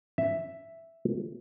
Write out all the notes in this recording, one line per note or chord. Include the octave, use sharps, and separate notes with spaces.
E5